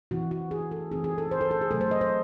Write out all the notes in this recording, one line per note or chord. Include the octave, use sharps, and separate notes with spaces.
C3 E3 C4 E4 F#4
F#4
G#4
A4
E3 C4 D#4 G#4
G#4
A4
C5
A4
A4
G#4
C3 F#3 A3 A4
C5
D#5
C5